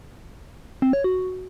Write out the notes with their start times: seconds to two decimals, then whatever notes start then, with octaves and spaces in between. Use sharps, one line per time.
0.82 C4
0.93 C#5
1.04 F#4